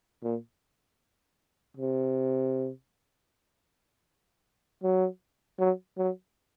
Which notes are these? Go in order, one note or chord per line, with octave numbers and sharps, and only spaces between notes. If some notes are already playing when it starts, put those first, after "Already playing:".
A#2
C3
F#3
F#3
F#3